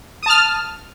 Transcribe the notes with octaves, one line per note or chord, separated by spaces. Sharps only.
A5 D#6 F6